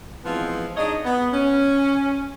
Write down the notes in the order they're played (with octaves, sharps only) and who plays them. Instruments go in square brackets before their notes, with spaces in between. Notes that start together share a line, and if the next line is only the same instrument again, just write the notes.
[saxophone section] E3 F3 G#3 B3 C4 F4
D4 D#4 G#4 C#5 D#5
B3
C#4